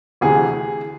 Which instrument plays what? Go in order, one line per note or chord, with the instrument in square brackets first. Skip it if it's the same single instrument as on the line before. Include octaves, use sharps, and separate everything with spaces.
[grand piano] D2 C3 E3 G#4